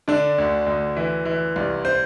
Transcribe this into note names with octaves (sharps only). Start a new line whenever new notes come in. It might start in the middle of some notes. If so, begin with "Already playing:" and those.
D3 D4
D2
D2
E3
E3
C2
C5